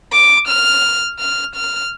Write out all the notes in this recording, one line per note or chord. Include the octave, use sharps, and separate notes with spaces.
D6
F6
F6
F6